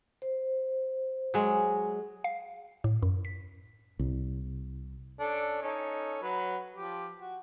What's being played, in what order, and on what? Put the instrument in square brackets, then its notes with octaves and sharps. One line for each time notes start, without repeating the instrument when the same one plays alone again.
[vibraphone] C5
[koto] F#3 G#3
[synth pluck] F5
A2
F#2
B6
[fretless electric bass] C2
[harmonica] C#4 D4 A4
C#4 D#4 A4
F#3 B4
F3 G4
F#4